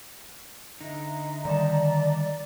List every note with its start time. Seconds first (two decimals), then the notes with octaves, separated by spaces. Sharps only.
0.80 D3 D#4 D#5 E5 A#5
1.45 D3 D#3 G3 D5 A5